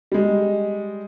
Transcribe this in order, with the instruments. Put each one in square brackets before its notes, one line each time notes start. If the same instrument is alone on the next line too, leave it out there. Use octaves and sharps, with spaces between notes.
[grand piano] G3 G#3